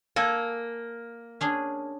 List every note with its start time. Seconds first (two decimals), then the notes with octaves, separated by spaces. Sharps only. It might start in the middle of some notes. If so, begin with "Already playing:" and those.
0.16 A#3 A4 D5 G#5
1.41 C#4 D4 G#4